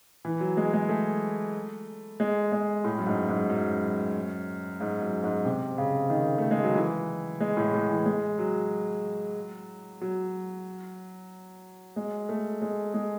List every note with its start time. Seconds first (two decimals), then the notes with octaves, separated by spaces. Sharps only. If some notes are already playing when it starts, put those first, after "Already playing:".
0.25 E3
0.40 F#3
0.57 G#3
0.73 G#3
0.89 A3
2.20 G#3
2.52 G#3
2.84 A2
2.98 F#2
3.06 G#2
3.29 G#2
3.50 F#2
4.80 G#2
5.02 F#2
5.24 G#2
5.45 C3
5.78 C#3
6.10 D#3
6.38 A3
6.51 G#3
6.64 F#3
6.75 E3
7.40 G#3
7.57 A2
7.74 A2
7.90 E3
8.06 G#3
8.39 F#3
10.01 F#3
11.96 G#3
12.29 A3
12.62 G#3
12.94 G#3